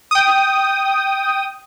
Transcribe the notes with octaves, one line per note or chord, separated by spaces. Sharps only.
G5 D#6